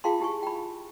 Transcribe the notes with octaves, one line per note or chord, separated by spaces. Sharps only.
F4 G#4 F5 G5 A5 C6
E4 G4 G#5 C#6
G5 B5